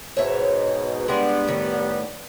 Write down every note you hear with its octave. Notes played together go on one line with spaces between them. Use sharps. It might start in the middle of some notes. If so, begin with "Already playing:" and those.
G#2 B2 C#5 E5
G3 G#3 B3 D4
A2 D#3